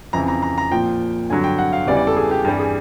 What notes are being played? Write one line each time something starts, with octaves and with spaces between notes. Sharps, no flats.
F2 C#3 E3 A#5
A#5
A#5
A#5
A#2 F3 G5
G2 D3 F#3 G#5
G5
F#5
F5
E2 C#3 E3 G3 D5
D5
A4
G#4
G4
G2 E3 G3 G4
G#4